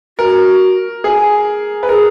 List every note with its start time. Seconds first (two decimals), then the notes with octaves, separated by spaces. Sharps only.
0.18 F#4 A#4
1.04 G#4
1.83 B4
1.89 G#4 A#4